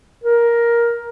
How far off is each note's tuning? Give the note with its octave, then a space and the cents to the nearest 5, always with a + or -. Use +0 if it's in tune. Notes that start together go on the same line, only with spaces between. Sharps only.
A#4 +10